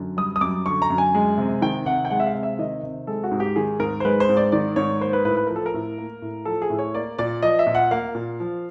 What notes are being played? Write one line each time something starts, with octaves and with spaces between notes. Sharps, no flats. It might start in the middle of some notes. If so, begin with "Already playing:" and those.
Already playing: F#2 D3
G3 D#6
D#6
F#2 D6
D3 C#6
A#5
F#2
G#5
G#3
C3
D#3 G5
C3 F#5
G5
G#3 F#5
E5
F5
C3
E5
D#3 D#5
C3
G#3 A4
F#4
G#2
G4
D#3 G#4
G#2 A#4
C5
G#3 B4
C5
G#2
D5
D#3 D5
G#2 C#5
A#3 C5
B4
A2 B4
B4
F3 A#4
A4
A#4
A2
A#3
A2
F3 A4
G#4
A2
C#5
A#3 D5
A#2 D5
F3 D#5
E5
A#2
F#5
A#3 F5
A#2
F3